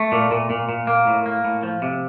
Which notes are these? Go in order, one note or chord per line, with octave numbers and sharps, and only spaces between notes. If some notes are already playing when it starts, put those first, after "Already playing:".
Already playing: A3
A#2
A#2
A#2
A#2
A#3
A2
A#3
A2
F3
C3